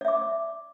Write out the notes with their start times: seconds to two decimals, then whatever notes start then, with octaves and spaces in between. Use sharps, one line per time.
0.01 D5
0.05 E5
0.08 D6